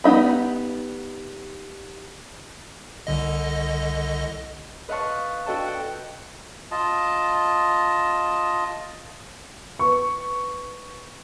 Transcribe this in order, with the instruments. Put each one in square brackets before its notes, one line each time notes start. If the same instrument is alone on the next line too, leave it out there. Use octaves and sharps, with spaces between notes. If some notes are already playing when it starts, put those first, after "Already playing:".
[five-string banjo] G3 B3 D#4 E5 B5
[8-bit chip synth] C2 D3 D#5
[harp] B4 D#5 F5 F#5 A5 C#6
D4 F#4 A4 D#5 G5 A5
F#5 G5
[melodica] F4 D#5 A5
[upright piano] B4 C#6